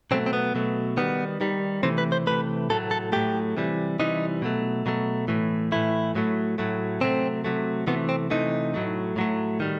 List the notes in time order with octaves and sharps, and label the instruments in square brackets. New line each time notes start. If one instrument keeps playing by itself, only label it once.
[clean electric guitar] B2 F#3 A3 C4
C4
B3
B2 F#3 A3
D#3 G3 B3
D#3 G3
C3 E3 A3 C4
B4
C5
C3 E3 A3 B4
A2 F#3 A3 A4
A4
A2 F#3 A3 G4
C3 E3 G3
C3 E3 G3 D#4
B2 F#3 A3
B2 F#3 A3
A2 E3 A3
A2 E3 A3 E4
A2 F#3 A3
A2 F#3 A3
C3 F#3 A3 C4
C3 F#3 A3
C3 E3 A3 B3
C4
C3 E3 A3 D#4
A2 F#3 A3
A2 F#3 A3
D#3 G3